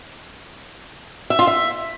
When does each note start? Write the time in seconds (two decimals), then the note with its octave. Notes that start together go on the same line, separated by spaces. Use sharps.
1.30 E5
1.39 F4
1.47 E5